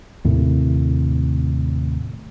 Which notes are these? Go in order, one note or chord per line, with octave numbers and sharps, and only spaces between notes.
D#2 A2 C3